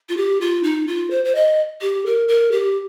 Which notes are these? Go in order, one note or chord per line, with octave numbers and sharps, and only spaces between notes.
F4
G4
F4
D#4
F4
C5
C5
D#5
G4
A#4
A#4
G4